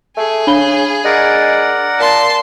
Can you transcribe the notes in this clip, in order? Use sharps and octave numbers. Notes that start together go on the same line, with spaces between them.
A3 G#4
C#3 D4 B5 G7
G#3 A#4 D5 F#5
A#2 A5 C6